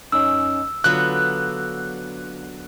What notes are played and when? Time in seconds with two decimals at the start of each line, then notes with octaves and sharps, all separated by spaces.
0.12 F#2 C#4 D#4 E6
0.84 D3 F#3 B3 F4 F#6